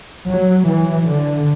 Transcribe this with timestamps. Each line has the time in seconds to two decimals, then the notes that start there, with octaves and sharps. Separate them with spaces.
0.28 F#3
0.68 E3
1.08 D3